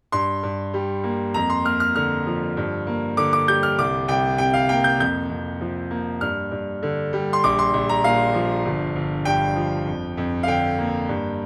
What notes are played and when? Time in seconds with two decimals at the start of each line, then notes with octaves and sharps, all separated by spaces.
0.12 G2 C6
0.43 G2
0.74 G3
1.04 A#3
1.34 F2 A#5
1.50 C6
1.64 A#3 F6
1.80 F6
1.96 D3 F6
2.27 F3
2.57 G2
2.87 A#3
3.17 D3 D6
3.33 D6
3.48 G3 G6
3.63 F6
3.78 C2 D6
4.08 C2 G5
4.38 C3 G5
4.54 F5
4.69 A#3 G5
4.84 G6
5.00 F2 G6
5.30 F2
5.61 F3
5.91 A#3
6.21 G2 F6
6.51 G2
6.83 D3
7.13 G3
7.33 C6
7.44 A#1 D6
7.59 C6
7.74 A#1
7.89 A#5
8.04 A#2 F5
8.34 F3
8.65 G1
8.96 G1
9.25 G2 G5
9.56 F3
9.87 F2
10.17 F2
10.43 F5
10.47 D3 G5
10.79 A#3
11.09 G2